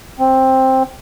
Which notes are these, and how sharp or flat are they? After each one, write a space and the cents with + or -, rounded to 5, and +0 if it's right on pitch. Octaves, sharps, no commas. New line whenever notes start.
C4 +10